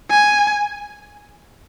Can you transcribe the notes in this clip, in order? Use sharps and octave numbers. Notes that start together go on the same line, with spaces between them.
G#5